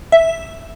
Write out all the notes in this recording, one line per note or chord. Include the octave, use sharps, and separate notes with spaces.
E5